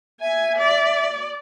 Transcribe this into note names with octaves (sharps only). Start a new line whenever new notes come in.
E5 G#5
D5